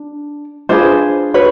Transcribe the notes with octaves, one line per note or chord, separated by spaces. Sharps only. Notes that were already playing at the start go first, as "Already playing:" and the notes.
Already playing: D4
D4 F4 G#4 B4 C5 D5
B4 C#5